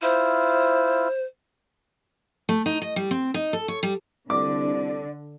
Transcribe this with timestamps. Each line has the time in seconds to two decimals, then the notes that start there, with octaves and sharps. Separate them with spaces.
0.02 E4 F4 C5
2.49 A3
2.66 D#4
2.82 D#5
2.96 G3
3.11 C4
3.34 D#4
3.53 A4
3.68 C#5
3.83 G3
4.30 C2 D3 D5 D6